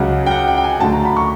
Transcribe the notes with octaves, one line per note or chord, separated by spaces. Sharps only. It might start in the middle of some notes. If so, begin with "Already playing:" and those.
Already playing: C#2 C#3 F#3 F#5
G5
F#5
G5
G5
G#5
D2 D3 F#3 A3 A5
A#5
B5
C#6